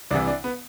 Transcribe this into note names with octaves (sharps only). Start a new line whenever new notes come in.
C2 C3 E3 D4
D4
B3